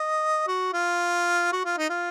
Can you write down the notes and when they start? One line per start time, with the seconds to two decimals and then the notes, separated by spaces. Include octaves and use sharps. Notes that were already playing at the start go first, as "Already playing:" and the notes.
Already playing: D#5
0.48 F#4
0.73 F4
1.52 F#4
1.65 F4
1.77 D#4
1.90 F4